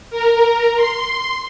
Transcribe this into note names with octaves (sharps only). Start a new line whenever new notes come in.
A#4
C6